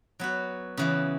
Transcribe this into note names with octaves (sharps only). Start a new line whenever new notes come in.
F#3 B3 F#4
C#3 E3 B3 F#4